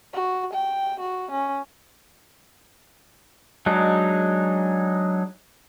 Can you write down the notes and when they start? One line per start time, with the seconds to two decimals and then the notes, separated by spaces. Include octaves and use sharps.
0.13 F#4
0.53 G5
1.00 F#4
1.31 C#4
3.66 F#3 G#3 D4 D#4 F#4